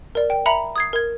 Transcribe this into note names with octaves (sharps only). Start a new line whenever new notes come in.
A#4 D5
G5
E5 A#5 B5 C#7 F7 F#7
D#6 G#6 C7
A#4 G#6